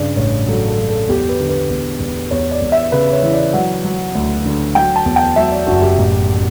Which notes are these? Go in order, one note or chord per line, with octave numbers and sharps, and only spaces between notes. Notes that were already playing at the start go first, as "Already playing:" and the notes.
Already playing: G2 C#3 D5
A1 C#5
F#3 A4
A4
F#3
A4
E2 G4
B4
D3
B4
E2
E2
E2 C#5
D5
E2
E5
C#3 B4
C#5
E3
D5
F#3 F#5
F#3
D2
D3
F#3 G5
A5
E2
G5
F#3 E5
D5
F#1 F#4
G4
A1